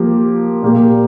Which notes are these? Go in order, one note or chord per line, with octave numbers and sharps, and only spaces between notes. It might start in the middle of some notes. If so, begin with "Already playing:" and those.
Already playing: F3 A#3 G4
A#2 A#3 G4